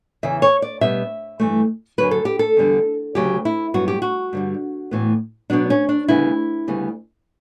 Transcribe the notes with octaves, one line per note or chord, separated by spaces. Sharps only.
E2 C#3 E3 E5
C#5
D5
B2 G3 B3 E5
G2 E3 A3
F#2 D3 F#3 B4
A4
G4
A4
E2 D3 G3 B3
D2 C#3 F#3 G4
E4
G2 F#3 B3 F#4
G4
F#4
G2 D3 G3
A2 E3 B3
B2 F#3 B3 D4
C#4
D4
D2 C#3 G3 B3 E4
D2 C#3 G3 B3